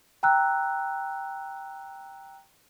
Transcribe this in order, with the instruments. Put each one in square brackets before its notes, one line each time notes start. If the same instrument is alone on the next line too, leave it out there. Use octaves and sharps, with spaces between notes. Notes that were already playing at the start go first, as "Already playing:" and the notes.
[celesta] G5 A#5 E6 F#6